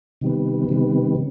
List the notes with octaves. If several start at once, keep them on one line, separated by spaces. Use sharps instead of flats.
C3 D#3 G3 B3
C3 D#3 G3 B3
C#3